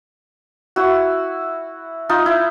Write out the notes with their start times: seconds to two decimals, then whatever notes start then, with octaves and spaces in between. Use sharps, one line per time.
0.76 E4 F#4
2.09 D#4 F4
2.26 E4